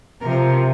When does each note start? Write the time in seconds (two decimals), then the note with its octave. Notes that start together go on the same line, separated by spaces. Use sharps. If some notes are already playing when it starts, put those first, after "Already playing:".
0.20 C3 F3 A#4